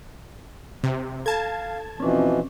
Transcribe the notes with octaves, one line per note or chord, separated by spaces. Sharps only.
C3
A4 F5 A5 G#6
B2 E3 F3 C4 C#4